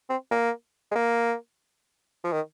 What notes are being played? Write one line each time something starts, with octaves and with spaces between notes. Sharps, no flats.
C4
A#3
G#3
A#3
F3
D#3